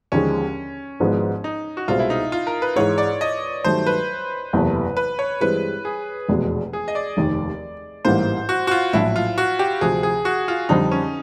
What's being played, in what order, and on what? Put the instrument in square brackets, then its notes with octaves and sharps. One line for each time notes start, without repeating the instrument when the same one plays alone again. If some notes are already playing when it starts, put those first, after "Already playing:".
[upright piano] D#2 D3 F3 G#3 [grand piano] C#4
[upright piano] G#1 G#2 F3 G#3 B3
[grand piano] D#4
F#4
[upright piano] C2 B2 G#3 C4 [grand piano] F4
[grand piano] E4
D#4
F4
A#4
B4
[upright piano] G#2 E3 G#3 [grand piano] C#5
[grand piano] D5
D#5
[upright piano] G2 D#3 F#3 A3 [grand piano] C5
[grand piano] B4
[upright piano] F#1 E2 C3 E3 A3
[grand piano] B4
C#5
[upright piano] G2 E3 G#3 C4 [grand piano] B4
[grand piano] G#4
[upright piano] F1 E2 B2 G#3
[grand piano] G#4
D#5
D5
[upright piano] F1 D#2 D#3
[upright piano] A1 G#2 E3 G3 A#3 [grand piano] C5
[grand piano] F#4
F#4
F4
[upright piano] A#1 A2 F#3 A3 [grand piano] E4
[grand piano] F4
F#4
G4
[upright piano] D2 C3 F3 [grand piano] G#4
[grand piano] G#4
F#4
F4
[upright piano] F2 D3 G3 C4 [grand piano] D#4
[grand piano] C#4